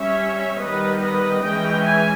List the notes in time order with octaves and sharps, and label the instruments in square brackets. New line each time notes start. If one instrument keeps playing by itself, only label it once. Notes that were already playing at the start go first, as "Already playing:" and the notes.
Already playing: [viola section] G3 C#4 C#5 E5
D#3 G3 B3 B4 D#5
B4 D#5
E3 G#3 C#4 D#5 G5
E5 G#5